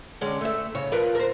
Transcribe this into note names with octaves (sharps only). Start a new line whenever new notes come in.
D3 G#3 C#4
A3 E5
C#3 C#5
F3 A#4 B4
A#4 C5